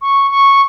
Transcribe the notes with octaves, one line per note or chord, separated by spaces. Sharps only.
C#6
C#6